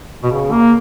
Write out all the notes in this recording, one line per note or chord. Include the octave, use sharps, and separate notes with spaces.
B2
C#3
A#3